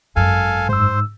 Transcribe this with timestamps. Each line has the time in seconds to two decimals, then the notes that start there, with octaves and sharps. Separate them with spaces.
0.16 G#1 F#2 A4 F5 G#5
0.69 G#2 C5 E6